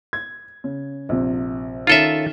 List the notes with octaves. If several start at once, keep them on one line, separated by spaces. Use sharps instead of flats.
G#6
C#3
A#1 F2 C3
D#3 C#4 D#4 F4 A4 E5